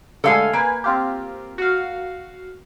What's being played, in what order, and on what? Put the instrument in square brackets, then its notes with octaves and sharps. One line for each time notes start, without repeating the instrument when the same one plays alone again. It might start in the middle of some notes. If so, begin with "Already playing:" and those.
[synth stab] D3 G#3 A3 [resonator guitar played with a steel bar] A4 F5 G#5
[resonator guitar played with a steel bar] A#3 [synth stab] B4 G#5
[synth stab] C4 F4 G4
F#4 F5